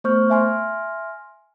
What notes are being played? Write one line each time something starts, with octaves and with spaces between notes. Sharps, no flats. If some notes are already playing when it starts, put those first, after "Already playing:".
A3 B3 C5 C#6 F6 G6
E5 G#5 C6 F6